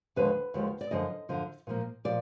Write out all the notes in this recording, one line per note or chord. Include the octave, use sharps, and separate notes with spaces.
D#2 D3 F3 G#3 B4
D#2 D3 F3 G#3
D5
F#2 D3 F3 D#5
F#2 D3 F3
A#2 F3 A#3
A#2 F3 D5